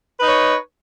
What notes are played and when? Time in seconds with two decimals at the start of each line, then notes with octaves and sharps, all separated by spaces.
0.18 B4
0.23 D#4
0.27 C#5